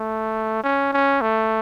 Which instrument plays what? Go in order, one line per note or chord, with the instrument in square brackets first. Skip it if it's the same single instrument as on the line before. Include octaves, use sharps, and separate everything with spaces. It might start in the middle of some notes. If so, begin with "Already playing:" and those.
Already playing: [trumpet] A3
C#4
C#4
A3